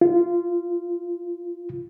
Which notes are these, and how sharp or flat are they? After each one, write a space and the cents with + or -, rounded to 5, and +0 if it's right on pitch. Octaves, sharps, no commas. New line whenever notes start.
F4 -20